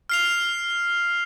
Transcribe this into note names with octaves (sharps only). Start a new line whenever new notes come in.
F6 C7 F7